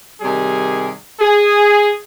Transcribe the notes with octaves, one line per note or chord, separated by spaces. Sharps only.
C3 D#3 G3 G#4
G#4